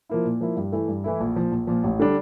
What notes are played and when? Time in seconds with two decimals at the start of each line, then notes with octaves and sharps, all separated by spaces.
0.09 F3 A#3 E4
0.25 A#2
0.41 F3 A#3 E4
0.57 G2
0.72 E3 A3 E4
0.88 G2
1.04 E3 A3 E4
1.20 A#1
1.36 A#2 F3
1.52 A#1
1.67 A#2 F3
1.84 A1
2.00 D3 G3 D4